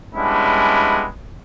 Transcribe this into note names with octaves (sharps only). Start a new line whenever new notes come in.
G3 G#3 B3 C#4 D4 E4